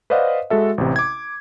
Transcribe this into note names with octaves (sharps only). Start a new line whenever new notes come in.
B4 C5 D5 D#5 F5 F#5
G#3 F#4 A4 E5
A1 C3
D6 G#6